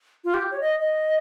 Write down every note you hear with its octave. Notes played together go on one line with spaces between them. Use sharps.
F4
G4
C#5
D#5
D#5